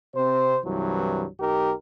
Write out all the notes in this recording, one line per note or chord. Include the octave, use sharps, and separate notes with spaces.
C3 C4 C5
C2 G2 E3 F#3
B1 D#4 G4 A#4